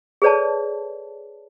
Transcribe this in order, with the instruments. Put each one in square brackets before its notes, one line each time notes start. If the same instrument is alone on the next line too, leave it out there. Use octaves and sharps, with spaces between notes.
[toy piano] G#4 A4 B4 C#5 D5 A5